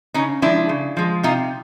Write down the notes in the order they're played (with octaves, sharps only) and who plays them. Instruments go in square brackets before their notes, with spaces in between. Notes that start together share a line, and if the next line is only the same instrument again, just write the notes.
[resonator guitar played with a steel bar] C#3 C#4 D#4
F3 G#3 D4 E4
C#3
F3 G#3
C3 D#4 F4